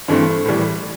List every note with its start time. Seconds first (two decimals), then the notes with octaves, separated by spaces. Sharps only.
0.08 G2 E3 A3 C4
0.46 A2 E3 G3